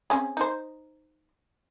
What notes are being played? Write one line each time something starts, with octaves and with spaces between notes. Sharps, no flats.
C4 C#4 G#4
D#4 C5